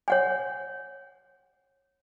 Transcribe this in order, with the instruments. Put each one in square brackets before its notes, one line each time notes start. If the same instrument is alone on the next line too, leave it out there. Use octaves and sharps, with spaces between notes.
[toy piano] C#5 F#5 G#5